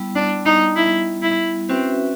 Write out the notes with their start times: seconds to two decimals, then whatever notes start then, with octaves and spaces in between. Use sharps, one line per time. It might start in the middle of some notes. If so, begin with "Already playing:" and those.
Already playing: G3 B3 E4
0.15 D4
0.46 D#4
0.76 E4
1.22 E4
1.69 C4 C#4 F#4 B4 E5